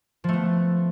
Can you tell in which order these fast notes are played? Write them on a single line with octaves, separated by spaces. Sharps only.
F3 A3 B3